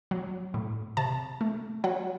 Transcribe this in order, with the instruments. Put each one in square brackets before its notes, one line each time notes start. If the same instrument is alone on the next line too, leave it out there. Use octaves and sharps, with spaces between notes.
[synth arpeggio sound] F#3
A2
C3 A5
A3
F#3 F#5